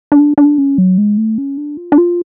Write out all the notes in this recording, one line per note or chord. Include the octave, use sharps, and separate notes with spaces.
D4
D4
C#4
F#3
G#3
A3
C#4
D4
F4
D4
F4